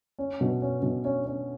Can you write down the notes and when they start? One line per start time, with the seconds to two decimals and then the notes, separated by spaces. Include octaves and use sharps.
0.19 C#4
0.41 B2
0.62 C#4
0.82 B2
1.05 C#4
1.26 C#4